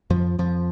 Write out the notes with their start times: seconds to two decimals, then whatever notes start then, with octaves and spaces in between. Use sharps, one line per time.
0.10 F2 F3
0.38 F2 F3